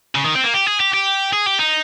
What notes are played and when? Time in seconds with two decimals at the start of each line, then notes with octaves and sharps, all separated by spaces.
0.15 C#3
0.24 D#3
0.35 C4
0.44 A#3
0.54 G4
0.67 G#4
0.80 G4
0.94 G4
1.33 G#4
1.46 G4
1.59 D#4